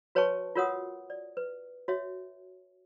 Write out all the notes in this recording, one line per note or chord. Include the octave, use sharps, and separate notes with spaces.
F#4 B4 C#5 G5 A5 C#6
F4 F#4 A#4 C#5 F#5 D#6
D5
B4
F#4 C#5 E5